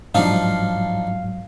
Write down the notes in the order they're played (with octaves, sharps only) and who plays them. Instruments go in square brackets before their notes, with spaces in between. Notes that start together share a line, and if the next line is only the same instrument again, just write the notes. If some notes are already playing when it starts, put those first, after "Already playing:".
[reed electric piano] G#2 F#3 [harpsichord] F3 D4 D#4 [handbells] F5